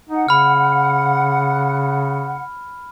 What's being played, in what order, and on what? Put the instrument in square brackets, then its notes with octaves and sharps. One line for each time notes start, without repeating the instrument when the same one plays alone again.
[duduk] D#4 [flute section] F#5
[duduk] C#3 [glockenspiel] B5 F6